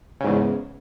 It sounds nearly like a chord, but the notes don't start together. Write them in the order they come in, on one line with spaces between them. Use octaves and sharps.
C#3 G#2 E2